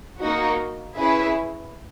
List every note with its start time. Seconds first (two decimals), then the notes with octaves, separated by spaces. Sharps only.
0.19 A#3 D#4 F#4
0.96 C#4 E4 G#4 B4 E5